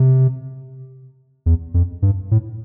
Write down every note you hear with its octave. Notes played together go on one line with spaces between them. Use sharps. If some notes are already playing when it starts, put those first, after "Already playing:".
Already playing: C3
E2
F2
G2
A2